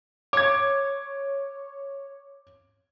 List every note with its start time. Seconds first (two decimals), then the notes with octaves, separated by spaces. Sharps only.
0.33 C#5 D6 G#6